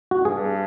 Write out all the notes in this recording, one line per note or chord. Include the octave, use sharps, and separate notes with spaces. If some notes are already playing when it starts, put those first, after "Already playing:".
F#4
G2 G#4